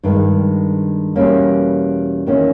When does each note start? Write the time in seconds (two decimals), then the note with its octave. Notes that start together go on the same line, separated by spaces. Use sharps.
0.03 G2 D#3 G#3
1.16 E2 B2 G3 A#3 C#4
2.27 E2 D#3 A#3 C#4